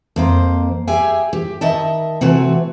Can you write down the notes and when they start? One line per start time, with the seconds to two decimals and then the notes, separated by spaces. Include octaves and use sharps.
0.16 F2 A#3 C5
0.87 G4 G#4 E5 G5 G#5
1.33 G4
1.61 D#3 D#5 E5 A5
2.21 C3 E3 A3 C4 F#4